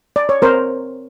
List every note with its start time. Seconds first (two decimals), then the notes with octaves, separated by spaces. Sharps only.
0.16 D5
0.29 C#5
0.42 C4 A#4 C5